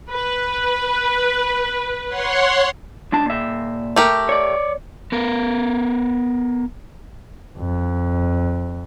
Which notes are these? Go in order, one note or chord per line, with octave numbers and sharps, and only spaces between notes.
B4
C#5 F#5 C6
C#2 D4 A5
A#2 E5
A3 G4 A#4
C#5 D5
B3 A#4
F2